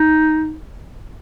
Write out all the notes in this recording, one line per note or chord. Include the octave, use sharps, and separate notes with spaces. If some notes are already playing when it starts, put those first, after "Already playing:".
Already playing: D#4